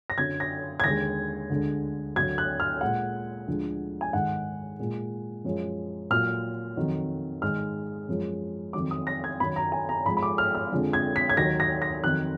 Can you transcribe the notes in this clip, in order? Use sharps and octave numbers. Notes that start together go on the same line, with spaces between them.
A#6
F#2 D3 F#3 G#6
A#6
G#6
D#2 D3 G#3 A#6
D2 D3 G#3
D2 D3 F#3 G#6
F#6
F6
A#2 G#3 F#5
D2 D3 F3 G#3
G#5
G#2 D#3 G#3 F#5
A#2 G#3
F#2 F3 G#3
A#2 F#3 F6
F2 D#3 F#3
G#2 D#3 G#3 F6
F#2 F3 G#3
F2 D#3 F#3 D6
D#6
A#6
G#6
F#2 D#3 F#3 B5
A#5
G#5
A#5
G#2 F3 G#3 B5
B5
D6
F6
F6
F2 D3 F3 G#3
G#6
B6
G#6
D#2 D#3 F#3 A#6
A#6
A#6
F2 D#3 F#3 F#6